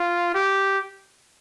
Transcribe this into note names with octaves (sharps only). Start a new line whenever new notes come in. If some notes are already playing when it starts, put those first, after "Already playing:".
Already playing: F4
G4